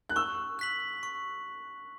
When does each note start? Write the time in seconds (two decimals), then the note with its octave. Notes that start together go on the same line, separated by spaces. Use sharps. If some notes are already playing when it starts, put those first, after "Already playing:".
0.09 F#6
0.16 C#6 E6
0.59 F#6 B6 F#7
1.03 C#6